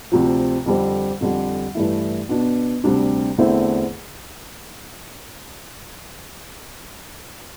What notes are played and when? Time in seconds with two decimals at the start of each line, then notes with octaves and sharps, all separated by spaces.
0.12 D2 C3 F3
0.66 F2 D3 G3 C4
1.21 F2 D3 G3
1.75 G2 E3 A3 E4
2.29 B2 B3 D4
2.84 D2 C3 G3 D4
3.38 E2 D3 A3 C4 E4